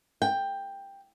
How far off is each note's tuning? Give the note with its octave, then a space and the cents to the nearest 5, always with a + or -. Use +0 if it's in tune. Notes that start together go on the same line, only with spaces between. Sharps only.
G5 +10